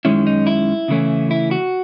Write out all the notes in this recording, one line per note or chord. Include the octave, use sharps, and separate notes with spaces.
F#2 D#3 G#3 C#4 E4
D#4
E4
C#3 E3 A3 C#4
E4
F#4